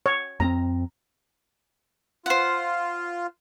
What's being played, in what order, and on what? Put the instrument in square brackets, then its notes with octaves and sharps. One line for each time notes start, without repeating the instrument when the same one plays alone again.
[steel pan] C#5
[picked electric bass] F2 A#3 C4 [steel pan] A#5
[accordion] F4 [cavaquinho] C5 F#5